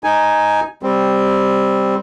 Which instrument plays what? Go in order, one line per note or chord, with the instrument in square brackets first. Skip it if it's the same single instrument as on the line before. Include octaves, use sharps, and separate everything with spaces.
[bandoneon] D#4 G#5
G3 C4